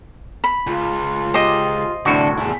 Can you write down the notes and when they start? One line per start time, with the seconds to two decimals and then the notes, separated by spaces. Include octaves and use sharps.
0.44 B5
0.67 C#2 F4
1.34 G4 C5 D#5
2.06 C2 A2 D3 D4 F#4
2.38 E2 E4 G#4 A5